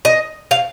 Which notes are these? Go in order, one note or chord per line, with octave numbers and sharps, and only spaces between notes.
D#5
F5